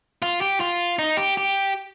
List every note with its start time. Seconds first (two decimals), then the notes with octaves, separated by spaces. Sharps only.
0.22 F4
0.41 G4
0.60 F4
0.99 D#4
1.17 G4
1.37 G4